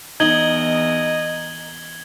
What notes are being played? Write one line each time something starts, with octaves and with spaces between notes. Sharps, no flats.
E2 D#4 D#5 G#6 F#7 G7